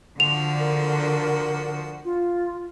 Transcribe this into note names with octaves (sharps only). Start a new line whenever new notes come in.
D3 F3 F#4 F7
A#4
F4